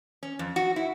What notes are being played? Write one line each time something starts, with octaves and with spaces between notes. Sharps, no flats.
C#4
F2
F#4
E4